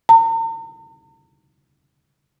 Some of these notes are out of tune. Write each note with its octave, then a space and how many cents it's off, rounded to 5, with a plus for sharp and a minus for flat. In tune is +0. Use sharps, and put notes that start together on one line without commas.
A#5 -45